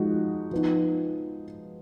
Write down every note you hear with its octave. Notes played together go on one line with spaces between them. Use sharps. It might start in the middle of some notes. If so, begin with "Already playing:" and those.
Already playing: F3 G#3 D#4 F#4
F3 B3 D#4